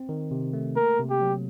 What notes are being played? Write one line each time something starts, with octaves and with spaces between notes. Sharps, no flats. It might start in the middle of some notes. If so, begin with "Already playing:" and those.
Already playing: C4
D#3
C3
A3
A#3 A#4
C3
G4
F#3